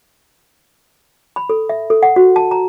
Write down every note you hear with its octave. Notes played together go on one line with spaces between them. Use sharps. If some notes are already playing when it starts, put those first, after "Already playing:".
B5
A4
E5
A4
F#5
F#4
A5
A#5